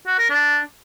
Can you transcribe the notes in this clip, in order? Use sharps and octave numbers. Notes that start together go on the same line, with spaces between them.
F#4
A#4
D4